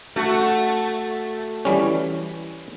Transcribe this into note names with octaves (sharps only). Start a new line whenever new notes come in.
A3 F#4
E3 G3 C#4